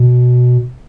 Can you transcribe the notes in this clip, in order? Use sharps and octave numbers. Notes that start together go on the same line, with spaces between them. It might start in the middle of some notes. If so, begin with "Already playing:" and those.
Already playing: B2